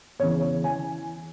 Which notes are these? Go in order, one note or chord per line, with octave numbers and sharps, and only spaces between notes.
E2 C#3 E3 C#5
E3 G#5